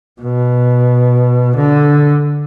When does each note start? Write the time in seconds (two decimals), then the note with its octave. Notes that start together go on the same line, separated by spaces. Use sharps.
0.22 B2
1.56 D3